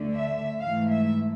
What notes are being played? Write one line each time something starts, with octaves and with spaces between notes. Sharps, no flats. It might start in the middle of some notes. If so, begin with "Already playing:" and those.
Already playing: D2 D3 A3
E5
G#2 E3 A3 F5
E5